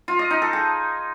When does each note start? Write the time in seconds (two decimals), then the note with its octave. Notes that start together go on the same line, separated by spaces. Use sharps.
0.08 F4
0.19 D#5
0.30 D#4
0.42 A4
0.53 G#4